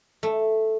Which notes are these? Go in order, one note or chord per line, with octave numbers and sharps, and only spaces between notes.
A3